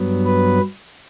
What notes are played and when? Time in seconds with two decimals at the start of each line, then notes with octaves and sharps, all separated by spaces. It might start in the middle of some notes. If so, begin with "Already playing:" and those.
Already playing: G2 F#3 B3
0.25 B4